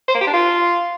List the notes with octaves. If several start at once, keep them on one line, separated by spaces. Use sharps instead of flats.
C5
A#3
G4
D4
F4